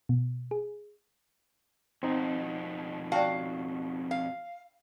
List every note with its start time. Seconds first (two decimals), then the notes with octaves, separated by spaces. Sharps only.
0.09 B2
0.51 G#4
2.03 F2 B2 C4 D#4
3.12 F#4 D5 F5 G5 A5
4.11 F5